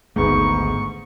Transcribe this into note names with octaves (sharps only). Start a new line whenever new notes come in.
G#1 D2 G#2 A3 B3 C#6